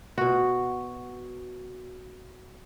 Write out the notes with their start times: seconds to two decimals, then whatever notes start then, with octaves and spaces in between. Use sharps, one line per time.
0.18 B2 F#4